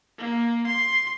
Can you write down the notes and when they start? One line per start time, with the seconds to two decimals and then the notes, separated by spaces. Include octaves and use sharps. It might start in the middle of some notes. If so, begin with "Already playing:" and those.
0.18 A#3
0.67 C6